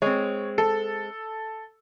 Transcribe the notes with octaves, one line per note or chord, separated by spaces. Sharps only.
G#3 C4 C#5
A4